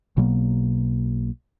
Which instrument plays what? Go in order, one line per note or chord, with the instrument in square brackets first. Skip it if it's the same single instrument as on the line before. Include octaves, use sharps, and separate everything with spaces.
[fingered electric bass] B1 B2 F#3 A#3